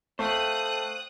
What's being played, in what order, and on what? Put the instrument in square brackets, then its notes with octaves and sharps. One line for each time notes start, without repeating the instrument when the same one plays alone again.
[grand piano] A3 [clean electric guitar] C5 F5 G5 [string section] D#6 F#6